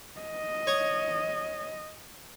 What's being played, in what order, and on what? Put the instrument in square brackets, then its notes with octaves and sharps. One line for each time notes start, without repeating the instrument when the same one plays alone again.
[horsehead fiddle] D#5
[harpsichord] C#5 C#6 D#6